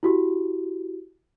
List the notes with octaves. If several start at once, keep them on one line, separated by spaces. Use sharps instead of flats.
E4 F#4 G4